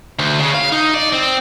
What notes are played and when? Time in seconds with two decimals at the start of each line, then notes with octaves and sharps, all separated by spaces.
0.19 D2
0.39 C#3
0.55 F5
0.72 D#4
0.94 D5
1.12 C4